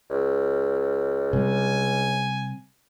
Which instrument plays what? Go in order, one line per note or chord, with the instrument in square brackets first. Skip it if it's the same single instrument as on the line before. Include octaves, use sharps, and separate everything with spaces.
[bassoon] C#2
[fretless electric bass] C3 G3 [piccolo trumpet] G#5